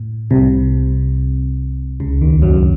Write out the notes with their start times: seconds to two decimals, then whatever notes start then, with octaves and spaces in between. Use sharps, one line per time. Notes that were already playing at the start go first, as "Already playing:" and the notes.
Already playing: A2
0.31 C2 C3
2.00 C#2 C#3
2.21 D#2 D#3
2.42 F#2 F#3